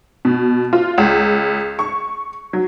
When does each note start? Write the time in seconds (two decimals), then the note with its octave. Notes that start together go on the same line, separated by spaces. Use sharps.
0.25 B2
0.73 F4
0.98 C#2
1.79 C#6
2.53 F#3